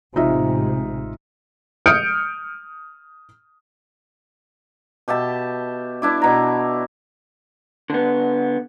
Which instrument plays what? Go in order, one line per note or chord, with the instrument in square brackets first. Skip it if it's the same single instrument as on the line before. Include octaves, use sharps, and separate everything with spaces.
[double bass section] A1 C3 G#3 [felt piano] D#4 F4 E5
[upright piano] D#6 F6 G6 C#7 D7
[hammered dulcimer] B2 G4 E5 A5
D4 E4 D5
B2 A#5
[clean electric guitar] D3 B3